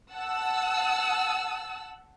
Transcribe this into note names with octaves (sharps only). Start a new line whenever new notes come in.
F#5 A5 E6